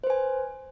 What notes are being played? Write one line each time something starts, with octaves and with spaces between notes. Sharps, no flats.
B4 C5 G#5